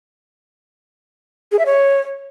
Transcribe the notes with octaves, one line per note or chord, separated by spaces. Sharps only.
G#4
E5
C#5